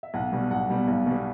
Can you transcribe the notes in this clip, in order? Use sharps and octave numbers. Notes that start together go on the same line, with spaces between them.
E5
B1 F#5
B2 G3 B3
B1 F#5
B2 G3 B3
B1
B2 G3 B3